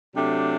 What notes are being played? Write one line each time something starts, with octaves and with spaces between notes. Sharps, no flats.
C3 F#3 A3 D4 G4